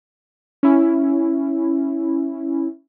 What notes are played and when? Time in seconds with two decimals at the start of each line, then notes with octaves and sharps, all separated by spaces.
0.63 C#4 E4